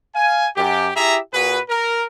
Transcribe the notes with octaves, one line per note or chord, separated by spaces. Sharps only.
F5 G#5
F#2 G4
E4 G4 G#4 E5 A#5
A#2 F#4 G#4 B4
A#4